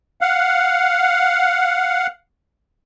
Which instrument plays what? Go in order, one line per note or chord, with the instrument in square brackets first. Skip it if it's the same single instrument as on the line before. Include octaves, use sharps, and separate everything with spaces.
[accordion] F5 F#5